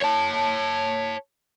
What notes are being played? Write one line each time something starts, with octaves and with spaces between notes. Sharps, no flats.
C#5 A5